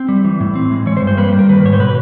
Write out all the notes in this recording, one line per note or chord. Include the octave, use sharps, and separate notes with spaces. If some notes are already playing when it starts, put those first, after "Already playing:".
Already playing: C4
G3
E3
A2
C4
G#3
E3 C#5
C5
G2
C5
A#3 B4
G3
A#4
D#3 B4
G#2 C#5
C5
B2 B4